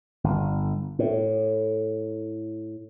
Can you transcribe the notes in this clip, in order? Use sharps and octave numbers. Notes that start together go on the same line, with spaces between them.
G1
A2